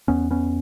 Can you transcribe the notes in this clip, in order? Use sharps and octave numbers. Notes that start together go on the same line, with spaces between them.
E2 B3 C#4
B3 C#4